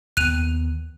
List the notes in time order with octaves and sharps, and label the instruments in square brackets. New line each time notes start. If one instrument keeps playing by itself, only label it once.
[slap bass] D#2 D#3 B3 [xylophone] F#6 D#7 F7